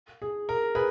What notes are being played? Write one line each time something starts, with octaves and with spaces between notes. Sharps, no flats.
G#4
A#4
G#4 B4